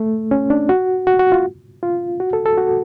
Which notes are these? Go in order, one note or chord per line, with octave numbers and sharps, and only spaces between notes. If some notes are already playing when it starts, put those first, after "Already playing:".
Already playing: A3
C#4
D4
F#4
F#4
F#4
F4
F4
F#4
A4
A4
F#4